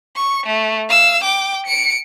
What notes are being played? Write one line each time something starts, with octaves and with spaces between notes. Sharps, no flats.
C#6
A3
F5 E6
G5 D6
C#7 D7